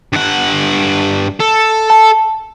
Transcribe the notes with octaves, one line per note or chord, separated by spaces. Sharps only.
G2 F#5
A4
A5